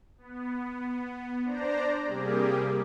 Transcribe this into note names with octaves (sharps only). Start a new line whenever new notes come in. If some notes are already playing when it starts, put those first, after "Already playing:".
B3
D4 C5 D5 A#5
C3 G3 A#3 G4 G#4